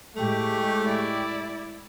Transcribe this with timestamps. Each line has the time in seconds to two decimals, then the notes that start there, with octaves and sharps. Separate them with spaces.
0.16 A2 G#3 A3 G4 C#6
0.85 E4 D5